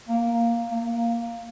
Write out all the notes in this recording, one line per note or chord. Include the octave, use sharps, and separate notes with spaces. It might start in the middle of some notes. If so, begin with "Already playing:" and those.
A#3
A#3